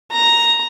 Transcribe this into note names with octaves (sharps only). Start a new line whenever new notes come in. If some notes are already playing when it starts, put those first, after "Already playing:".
A#5